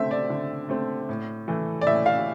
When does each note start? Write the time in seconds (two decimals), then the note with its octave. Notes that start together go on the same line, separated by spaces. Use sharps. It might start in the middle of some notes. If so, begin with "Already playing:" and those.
Already playing: D3 A3 C4 E5
0.11 D5
0.30 D3
0.69 A3 C4
1.09 A2
1.48 E3 A3
1.81 D5
1.87 A2 E5
2.06 F5